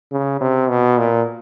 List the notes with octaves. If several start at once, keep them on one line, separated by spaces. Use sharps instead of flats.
C#3
C3
B2
A#2